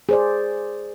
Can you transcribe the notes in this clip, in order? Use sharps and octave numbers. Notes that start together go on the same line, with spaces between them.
G#4 C5 D5